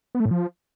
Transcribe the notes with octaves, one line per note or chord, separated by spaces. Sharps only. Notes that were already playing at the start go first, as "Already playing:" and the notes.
B3
A3
A2
F3